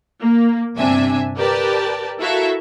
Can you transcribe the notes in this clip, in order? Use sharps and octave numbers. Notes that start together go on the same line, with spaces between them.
A#3
G1 C3 D4 E5 G#5
G4 A#4 B4 D5 A5
E4 F#4 A4 A#4 E5 F5